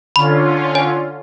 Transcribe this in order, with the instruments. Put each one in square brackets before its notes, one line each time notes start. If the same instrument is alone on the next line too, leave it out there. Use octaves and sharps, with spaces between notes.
[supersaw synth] D3 C#4 F4 [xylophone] B5
[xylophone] C#5 G#5